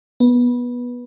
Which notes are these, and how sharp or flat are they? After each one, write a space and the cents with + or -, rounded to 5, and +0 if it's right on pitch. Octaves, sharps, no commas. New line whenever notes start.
B3 -15